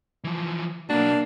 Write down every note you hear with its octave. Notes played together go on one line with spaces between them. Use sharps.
E3 F3
B1 A#3 D4 F#4